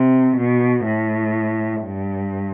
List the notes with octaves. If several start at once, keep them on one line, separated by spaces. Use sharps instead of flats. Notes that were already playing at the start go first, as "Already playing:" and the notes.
Already playing: C3
B2
A2
G2